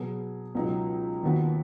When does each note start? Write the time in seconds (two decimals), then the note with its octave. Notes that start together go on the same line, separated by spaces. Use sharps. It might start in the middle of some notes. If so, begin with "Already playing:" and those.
Already playing: B2 F#3 B3 G#4
0.55 C#2 B2 F#3 D#4
1.23 D#2 D#3 B3 F#4 B4